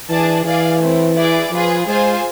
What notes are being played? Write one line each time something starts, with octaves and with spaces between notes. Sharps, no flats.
E3 D4 G#4 D5 A5
E3 G#4 D5 F5 G#5
A3 C4 E4
E4 G#4 B4 D5
F3 F4 G#4 B4
G#3 F4 G#4 C5 G#5